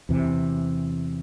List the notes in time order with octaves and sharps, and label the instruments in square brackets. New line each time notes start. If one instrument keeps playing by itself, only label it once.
[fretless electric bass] E2 C3 E3